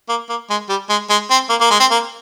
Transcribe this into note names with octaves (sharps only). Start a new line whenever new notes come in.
A#3
A#3
G#3
G3
G#3
G#3
C4
A#3
A#3
G#3
C4
A#3